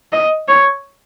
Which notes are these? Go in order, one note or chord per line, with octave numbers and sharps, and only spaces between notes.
D#5
C#5